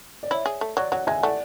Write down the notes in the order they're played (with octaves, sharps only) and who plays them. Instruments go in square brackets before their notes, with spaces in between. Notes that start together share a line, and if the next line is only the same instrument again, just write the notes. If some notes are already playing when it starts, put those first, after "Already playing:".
[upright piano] D5
[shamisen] E4 [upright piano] C#5 E5
[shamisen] G#4
A3
[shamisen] F#3 [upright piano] D5 F#5
[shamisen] F#3 [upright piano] D5 F#5
[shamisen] G#3 [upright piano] E5 G#5
[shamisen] A3 [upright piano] D5 F#5